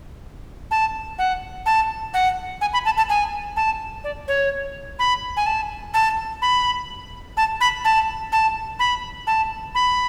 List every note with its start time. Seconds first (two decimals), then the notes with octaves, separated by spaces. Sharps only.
0.71 A5
1.18 F#5
1.66 A5
2.14 F#5
2.61 G#5
2.73 B5
2.85 A5
2.97 A5
3.09 G#5
3.56 A5
4.04 D5
4.28 C#5
4.99 B5
5.37 G#5
5.46 A5
5.94 A5
6.42 B5
7.37 A5
7.60 B5
7.84 A5
8.32 A5
8.79 B5
9.27 A5
9.75 B5